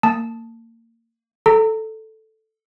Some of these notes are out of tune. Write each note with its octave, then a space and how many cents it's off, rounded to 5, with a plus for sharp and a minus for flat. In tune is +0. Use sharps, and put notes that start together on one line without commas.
A#3 -30 A5 +0 D#6 +0
A4 +0 A#5 -30